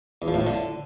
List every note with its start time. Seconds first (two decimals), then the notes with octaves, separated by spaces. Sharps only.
0.22 E2
0.28 F3
0.34 A2
0.40 F3
0.47 D3